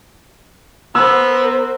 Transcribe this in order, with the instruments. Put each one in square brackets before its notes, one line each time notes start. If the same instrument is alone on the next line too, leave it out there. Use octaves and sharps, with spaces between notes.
[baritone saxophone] B3 [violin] A#4 C5 [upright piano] E6